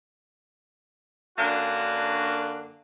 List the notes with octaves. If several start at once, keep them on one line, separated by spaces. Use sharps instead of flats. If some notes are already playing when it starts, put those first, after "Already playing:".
F#2 D3 A#3 D4 F#4